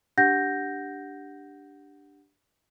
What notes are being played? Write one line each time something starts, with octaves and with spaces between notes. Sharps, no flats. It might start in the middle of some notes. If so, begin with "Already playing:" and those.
D4 G4 F#5 G6 A#6